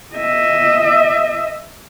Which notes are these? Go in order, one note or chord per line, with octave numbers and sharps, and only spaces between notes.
D#5 E5